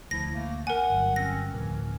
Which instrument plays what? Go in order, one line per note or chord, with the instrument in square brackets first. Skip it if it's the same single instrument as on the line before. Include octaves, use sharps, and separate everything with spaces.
[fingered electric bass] D2 [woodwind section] F3 E4 [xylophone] A#6
[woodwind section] A3 A#3
[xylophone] A#4 G#5 [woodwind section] F#5
[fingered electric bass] G1 F#3
[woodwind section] C4 C#4 [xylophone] A#6
[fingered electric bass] D2 A2 F3 [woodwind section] E3 C#4 A#4